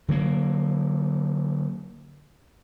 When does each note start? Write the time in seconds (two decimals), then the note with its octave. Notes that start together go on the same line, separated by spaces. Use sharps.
0.08 D3 F#3 A#3